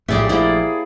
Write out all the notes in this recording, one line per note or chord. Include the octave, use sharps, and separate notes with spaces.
A#1 A2 A3 G4 G#4 D5 E5
A#3 E4 C5 D5